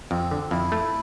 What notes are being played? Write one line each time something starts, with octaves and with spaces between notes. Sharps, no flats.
F2 C4
D3
F2 E4
A3